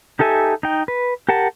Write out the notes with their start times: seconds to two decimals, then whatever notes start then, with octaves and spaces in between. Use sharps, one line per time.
0.19 D#4 G4 A4 E5 G#5
0.63 D#4 G5
0.88 B4
1.29 G4 A#4 F#5 A5